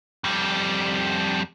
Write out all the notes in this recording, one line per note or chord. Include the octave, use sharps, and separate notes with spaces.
F2 G3